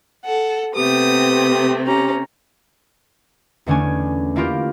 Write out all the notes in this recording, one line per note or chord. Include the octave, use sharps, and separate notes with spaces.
A4 F#5
C3 A3 B3 C4 G4 D#6
C#4 G4 A#5
E2 D3 A3 C#4 D4 G#5
A3 A#3 E4 F4 G4 A#4